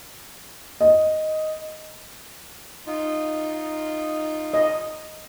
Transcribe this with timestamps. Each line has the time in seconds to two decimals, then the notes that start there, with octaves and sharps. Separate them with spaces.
0.81 D#5
2.87 D#4 F4
4.54 D#5